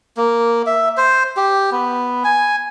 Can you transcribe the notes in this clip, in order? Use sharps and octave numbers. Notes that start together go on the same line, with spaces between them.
A#3
E5
C5
G4
B3
G#5